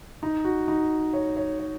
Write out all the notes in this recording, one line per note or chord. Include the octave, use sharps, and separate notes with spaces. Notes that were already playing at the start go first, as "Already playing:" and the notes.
D#4
F#4
D#4
C#5
C#5
C#5